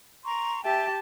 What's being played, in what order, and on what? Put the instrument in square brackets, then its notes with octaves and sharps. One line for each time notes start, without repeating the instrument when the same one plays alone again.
[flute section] A#5 C6 C#6
[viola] G4 A5 [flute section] E5 G5